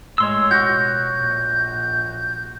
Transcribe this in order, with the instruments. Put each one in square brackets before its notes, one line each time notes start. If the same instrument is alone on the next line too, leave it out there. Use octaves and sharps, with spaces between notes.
[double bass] A2 G#3 [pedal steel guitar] C#5 C6 E6
[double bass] B2 [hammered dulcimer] F#4 [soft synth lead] G6
[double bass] A#1